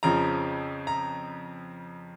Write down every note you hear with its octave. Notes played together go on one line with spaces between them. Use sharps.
F2 C#3 F3 A#5
A#5